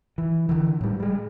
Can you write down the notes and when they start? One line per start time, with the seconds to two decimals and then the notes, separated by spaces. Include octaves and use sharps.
0.18 E3
0.49 D3 E3
0.81 A2 G3
1.00 G3 G#3